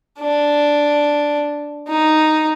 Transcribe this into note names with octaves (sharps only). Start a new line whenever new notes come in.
D4
D#4